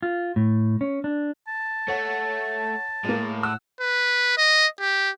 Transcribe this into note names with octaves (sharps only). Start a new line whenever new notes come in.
F4
A2
C#4
D4
A5
A3 C#5 F#5
A2 G#3 A#3
F#5 E6
B4
D#5
G4